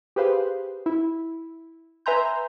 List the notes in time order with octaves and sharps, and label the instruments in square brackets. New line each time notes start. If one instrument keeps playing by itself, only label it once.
[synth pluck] G4 G#4 B4 C5 F5
E4
B4 E5 G#5 A#5 C6 G6